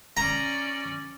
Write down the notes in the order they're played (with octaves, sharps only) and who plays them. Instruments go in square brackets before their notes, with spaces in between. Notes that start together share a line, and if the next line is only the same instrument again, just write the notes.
[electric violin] C#4 D5 [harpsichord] A#5